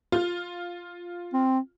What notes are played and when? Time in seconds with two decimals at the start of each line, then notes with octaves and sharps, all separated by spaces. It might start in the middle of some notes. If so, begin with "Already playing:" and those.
0.12 F4 F6
1.33 C4